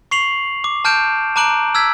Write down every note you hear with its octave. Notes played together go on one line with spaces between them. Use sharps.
C#6 C7 F7 F#7
D6
A5 F6 G6 D7 E7
A5 A#5 D6 F#6 D7 F#7
E6 F6 G#6 B6